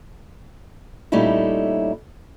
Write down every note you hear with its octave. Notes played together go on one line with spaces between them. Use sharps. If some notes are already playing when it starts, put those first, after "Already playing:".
A#2 G3 A3 C#4 D#4 E4